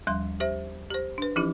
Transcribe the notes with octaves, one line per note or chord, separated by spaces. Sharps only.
D#2 F3 G3 C6
G4 C5 E5
G4 C5
D4 B4
E3 F3 C#4 D#4 E4 G4